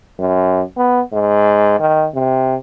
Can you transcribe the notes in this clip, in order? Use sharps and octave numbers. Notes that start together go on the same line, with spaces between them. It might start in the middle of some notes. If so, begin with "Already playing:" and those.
F#2
B3
G#2
D#3
C3